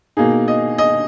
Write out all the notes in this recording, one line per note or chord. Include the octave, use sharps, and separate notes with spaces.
B2 A#3 D#4 G#4
D#5
D#5